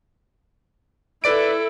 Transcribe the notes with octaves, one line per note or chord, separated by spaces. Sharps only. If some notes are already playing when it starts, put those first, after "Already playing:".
E4 A4 B4 D5 D7